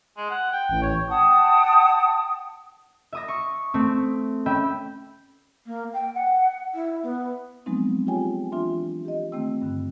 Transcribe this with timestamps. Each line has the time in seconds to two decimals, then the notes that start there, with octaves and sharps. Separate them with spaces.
0.17 G#3
0.30 F#5
0.52 G5
0.69 A1
0.82 C#5
1.09 F#5 G5 A5 D#6
3.13 E5 D#6 A#6
3.28 C#6
3.74 A3 C4
4.46 C#4 E5 G5 B5
5.66 A#3
5.93 G5
6.14 F#5
6.74 E4
7.03 B3
7.66 F3 F#3 G#3 B3 C4 D#4
8.07 F4 G4 G#4 C#5 G5 G#5
8.52 E3 D4 F4 E5 C6
9.05 G4 D#5
9.32 D#3 A3 C4 G5 E6
9.62 G2 D3